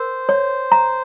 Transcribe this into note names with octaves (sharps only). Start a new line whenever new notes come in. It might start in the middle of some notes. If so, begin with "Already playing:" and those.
Already playing: A#4 C5
C#5
A#5